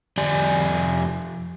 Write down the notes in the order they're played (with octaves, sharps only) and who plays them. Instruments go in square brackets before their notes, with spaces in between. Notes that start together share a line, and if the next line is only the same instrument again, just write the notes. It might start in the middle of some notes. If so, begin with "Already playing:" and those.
[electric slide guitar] F2 G4 D5 G#5